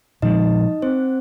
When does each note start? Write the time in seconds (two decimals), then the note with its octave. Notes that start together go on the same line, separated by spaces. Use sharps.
0.22 A#2 F3 G#3 D#4 D#5
0.82 C4 C5